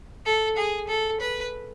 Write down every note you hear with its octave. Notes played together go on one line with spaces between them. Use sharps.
A4
G#4
A4
B4